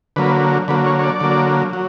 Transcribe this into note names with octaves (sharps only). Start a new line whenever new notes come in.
D3 F#3 A#3 B4
D3 F#3 A#3 B4
C#5
C#5
D5
D3 F#3 A#3
F#3